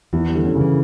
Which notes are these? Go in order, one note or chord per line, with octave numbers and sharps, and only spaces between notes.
E2 E3
G3
D3
C#4
C#3
E3